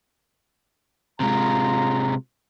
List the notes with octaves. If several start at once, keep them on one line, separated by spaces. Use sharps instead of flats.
C3 G#3 F4 A#5